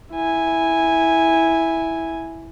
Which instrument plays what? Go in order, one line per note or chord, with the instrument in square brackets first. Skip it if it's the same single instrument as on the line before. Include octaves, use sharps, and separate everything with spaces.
[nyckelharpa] E4 G#5